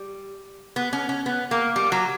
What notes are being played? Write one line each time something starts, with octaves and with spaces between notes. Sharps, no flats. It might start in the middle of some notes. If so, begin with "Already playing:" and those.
Already playing: G3
B3
C#4
C#4
B3
A#3
G3
F#3